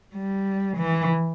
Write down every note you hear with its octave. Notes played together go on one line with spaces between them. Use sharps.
G3
E3